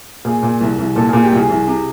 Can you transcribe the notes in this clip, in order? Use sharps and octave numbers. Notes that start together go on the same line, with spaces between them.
A#2 G#4
A#2
C2
C2
A#2 A4
A#2 G#4
G4
C2
G#4
C2
C3